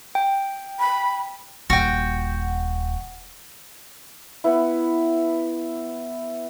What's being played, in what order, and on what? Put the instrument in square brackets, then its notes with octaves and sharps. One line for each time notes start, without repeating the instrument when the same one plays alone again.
[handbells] G5
[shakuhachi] B5
[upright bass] D#1 [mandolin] F#4 G5
[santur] B3 E4